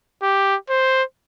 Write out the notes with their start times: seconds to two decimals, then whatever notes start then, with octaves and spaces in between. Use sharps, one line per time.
0.23 G4
0.70 C5